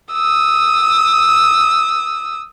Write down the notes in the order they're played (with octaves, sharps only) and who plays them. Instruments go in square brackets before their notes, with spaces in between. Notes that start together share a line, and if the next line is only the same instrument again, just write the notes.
[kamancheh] D#6 E6